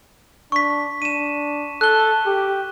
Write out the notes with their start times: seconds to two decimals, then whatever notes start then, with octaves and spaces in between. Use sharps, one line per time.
0.52 D4 C#6 B6
1.02 D4 D#7 E7
1.81 A4 F#6 G7
2.26 G4